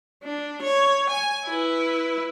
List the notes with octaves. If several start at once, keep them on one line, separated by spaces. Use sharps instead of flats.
D4
C#5
G#5
E4 B4